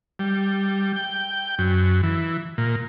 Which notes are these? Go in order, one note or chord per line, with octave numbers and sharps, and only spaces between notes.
G3
G5
F#2
E3
A#2